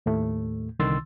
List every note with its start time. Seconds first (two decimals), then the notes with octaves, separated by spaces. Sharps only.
0.06 D#2 A2 A3
0.79 C2 D3 D#3 C6 E6 A6